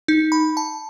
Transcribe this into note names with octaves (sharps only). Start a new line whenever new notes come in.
D#4
B5
A5